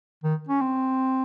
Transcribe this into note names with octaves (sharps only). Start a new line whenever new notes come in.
D#3
C#4
C4